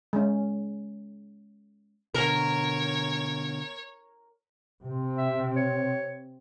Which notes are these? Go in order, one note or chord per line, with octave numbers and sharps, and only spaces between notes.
G#3 C#4
B2 D3 A#4 C#5
C3 C4
E5
C#5